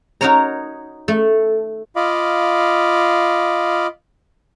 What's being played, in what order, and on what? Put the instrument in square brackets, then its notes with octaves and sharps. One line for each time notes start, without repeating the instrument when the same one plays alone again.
[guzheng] D#4 F#4 A#4 C#5 A#5
A3 A4
[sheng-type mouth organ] F4 D#5 F5 B5 D6